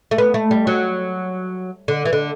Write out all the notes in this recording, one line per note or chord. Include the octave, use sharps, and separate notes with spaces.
A3
B3
A3
G3
F#3
D3
E3
D3